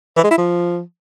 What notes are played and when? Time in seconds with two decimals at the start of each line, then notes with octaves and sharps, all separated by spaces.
0.17 E3
0.24 G#3
0.31 E4
0.38 F3